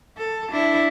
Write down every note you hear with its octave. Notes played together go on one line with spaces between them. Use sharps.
A4
D4 E4